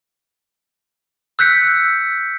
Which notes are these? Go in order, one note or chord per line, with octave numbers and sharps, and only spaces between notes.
E6 F#6 G6 B6 C#7